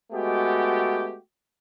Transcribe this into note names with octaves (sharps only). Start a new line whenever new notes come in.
G#3 A3 B3 F#4 G4